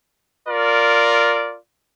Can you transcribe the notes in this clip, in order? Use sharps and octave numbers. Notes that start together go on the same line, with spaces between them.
F4 A#4 D5